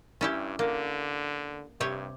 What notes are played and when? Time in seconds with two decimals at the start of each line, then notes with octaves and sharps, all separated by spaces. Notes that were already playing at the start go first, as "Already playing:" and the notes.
0.21 G2 C#4 E4 G4
0.59 D3 A#3
1.80 G2 C3 G4 C#5